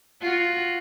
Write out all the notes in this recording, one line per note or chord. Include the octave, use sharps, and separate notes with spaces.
F4 F#4